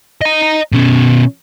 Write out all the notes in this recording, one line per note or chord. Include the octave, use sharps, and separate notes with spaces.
D#5 A#5
B2 C#4